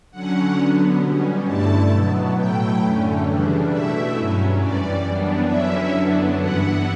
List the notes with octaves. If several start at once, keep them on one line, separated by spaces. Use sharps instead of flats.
D3 F#3 C#4 F#5
D3 F#3 B3
B2 G3 C#4
G2 D3 A3 E4 A5
B2 F#3 B3
A2 F#3 A3 E4 G5
F#2 D3 A3 C#4
C#3 E3 G3 D4
B2 A3 E4 E5
G2 F#3 C#4
F#2 E3 G3 D5
F#2 E3 G3 B3 D4
D3 F#3 C#4 E4 E5
F#2 D3 F#3 B3 D4
G2 E3 B3 E4 F#5